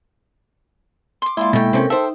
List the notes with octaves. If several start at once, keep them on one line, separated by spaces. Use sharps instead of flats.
C6 D6
G#3 A#3 E4 F4 D5 C6
B2 A3 D#4 G5
C3 C4 C#4 A4 A#4
D#4 A4 C5 E5 G5